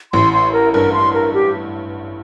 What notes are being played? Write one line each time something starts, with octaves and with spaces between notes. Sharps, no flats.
A1 A2 C6
C6
A#4
G2 A#4
C6
A#4
G4